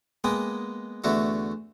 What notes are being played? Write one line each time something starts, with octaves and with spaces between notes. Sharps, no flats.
G#3 A#3 B3 G5 G#5
E2 D3 A3 F#4 E5